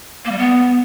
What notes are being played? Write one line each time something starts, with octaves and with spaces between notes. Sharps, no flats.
A#3
G3
B3